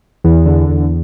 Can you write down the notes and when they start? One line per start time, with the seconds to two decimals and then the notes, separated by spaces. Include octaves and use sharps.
0.24 E2
0.46 D3
0.69 E2